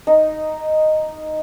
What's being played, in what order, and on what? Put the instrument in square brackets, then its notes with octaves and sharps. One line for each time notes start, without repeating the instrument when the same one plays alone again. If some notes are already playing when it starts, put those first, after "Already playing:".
[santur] D#4